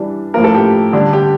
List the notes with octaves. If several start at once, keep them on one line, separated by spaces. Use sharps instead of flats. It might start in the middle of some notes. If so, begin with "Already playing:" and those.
Already playing: E3 G3 D4
A2 F3 A#3 A#4
A4
G4
D3 G3 D4
G4